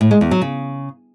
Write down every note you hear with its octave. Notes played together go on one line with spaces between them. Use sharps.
A2
G#3
E2
F#3
C#3